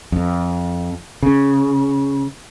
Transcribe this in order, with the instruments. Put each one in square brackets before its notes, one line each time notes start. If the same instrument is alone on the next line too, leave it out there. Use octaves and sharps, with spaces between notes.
[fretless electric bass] F2
C#3